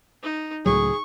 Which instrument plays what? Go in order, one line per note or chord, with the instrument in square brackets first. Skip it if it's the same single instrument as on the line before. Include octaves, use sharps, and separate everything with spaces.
[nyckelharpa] D#4
[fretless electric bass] C#2 A2 F#3 [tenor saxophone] G#4 [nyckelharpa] C#6